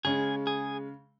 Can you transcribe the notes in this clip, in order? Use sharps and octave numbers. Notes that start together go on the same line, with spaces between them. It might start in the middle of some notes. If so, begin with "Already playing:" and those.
C#3 G#3 C#4 G#4
G#4